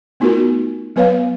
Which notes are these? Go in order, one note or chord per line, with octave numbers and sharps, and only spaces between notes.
A3 B3 D#4 F4 F#4 A#4
F#3 B3 B4 C#5 F5